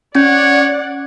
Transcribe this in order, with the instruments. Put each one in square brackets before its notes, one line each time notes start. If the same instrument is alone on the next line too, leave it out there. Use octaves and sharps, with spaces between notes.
[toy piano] C#4 [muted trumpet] C#5 [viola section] D5 F#5